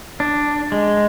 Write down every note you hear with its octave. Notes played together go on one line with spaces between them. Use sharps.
D4
G#3